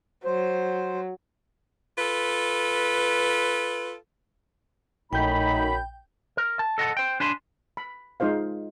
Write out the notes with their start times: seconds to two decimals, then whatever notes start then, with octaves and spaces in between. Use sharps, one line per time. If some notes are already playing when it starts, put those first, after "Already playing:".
0.25 F#3 C5
1.99 F4 A4 B4
5.13 A#1 F#2 A2 D#4 G5 B5 G6
6.37 A#4
6.59 A5
6.78 A4 D#5 F#5 A5
6.97 C5 G5
7.20 D4 G#5 A5 B5 C6
7.77 B5
8.20 G#3 D#4 F4 C5 F5